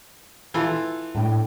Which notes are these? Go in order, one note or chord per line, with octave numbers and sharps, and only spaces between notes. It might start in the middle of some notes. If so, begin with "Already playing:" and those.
E3 F4 A4
A2 D4 G5